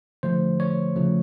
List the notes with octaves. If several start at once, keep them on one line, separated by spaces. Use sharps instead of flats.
D3 F3 A3 C5
C#5
C#3 F3 A3